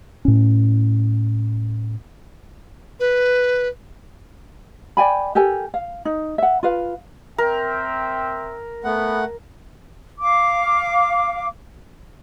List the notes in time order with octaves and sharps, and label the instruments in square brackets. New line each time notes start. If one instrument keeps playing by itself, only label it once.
[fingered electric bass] A2 C#4
[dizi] B4
[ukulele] D5 G5 G#5 B5
G4 A4 A#4 G#5
F5
D#4
E5 F#5
F4 B4 F5
[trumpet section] C4 E5 G5 [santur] A#4
[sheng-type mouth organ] A3 F#5 [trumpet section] B3
[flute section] F5 D6